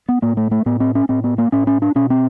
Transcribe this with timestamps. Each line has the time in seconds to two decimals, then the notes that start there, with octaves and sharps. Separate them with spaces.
0.09 B3
0.22 A2 A#3
0.37 A3
0.51 A3
0.66 A2 B3
0.80 C4
0.95 C#4
1.09 A2 C4
1.24 B3
1.38 A#3
1.52 A2 C#4
1.67 C#4
1.82 D4
1.95 B2 C#4
2.10 C4